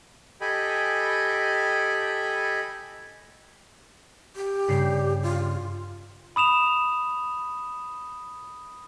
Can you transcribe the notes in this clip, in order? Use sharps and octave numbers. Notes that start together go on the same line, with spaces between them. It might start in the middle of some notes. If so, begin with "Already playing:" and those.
G4 A4 D#5 G5 G#5 B5
G4
G2 C#3 C7
F4
B5 D#6 E7 F7